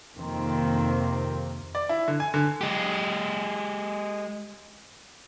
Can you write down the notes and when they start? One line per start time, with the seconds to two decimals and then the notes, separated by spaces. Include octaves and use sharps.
0.17 F2 C3 D#3 A#3 C4
1.75 D5
1.89 E4
2.08 D3
2.20 G#5
2.34 D3
2.61 G#3 G4